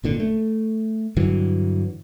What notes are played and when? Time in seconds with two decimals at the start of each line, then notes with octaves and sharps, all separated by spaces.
0.04 G#1 A#2 D3
0.20 A3
1.16 G2 D3 E3 F#3